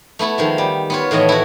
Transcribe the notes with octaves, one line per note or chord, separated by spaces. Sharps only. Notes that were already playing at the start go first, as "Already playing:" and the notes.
A3 B3 E4 A4
D#3 F3 G#3
G3
B3 F4 C#5
A2 D#3 E3 D#5 A5
E4 F#4